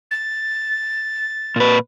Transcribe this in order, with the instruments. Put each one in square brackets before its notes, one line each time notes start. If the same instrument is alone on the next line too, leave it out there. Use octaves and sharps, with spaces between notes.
[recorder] A6
[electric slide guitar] A#2 B4